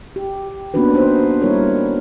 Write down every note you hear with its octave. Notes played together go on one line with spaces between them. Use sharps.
G4
A#3 B3 C#4 D4 F#4 B4
A#3 D#4 C5
G3 A#3 D#4 E4 A#4 C#5